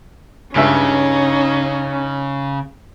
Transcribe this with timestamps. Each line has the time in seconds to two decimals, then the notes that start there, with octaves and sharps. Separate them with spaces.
0.55 C#2 G2 C#3 C#4 D#4 E5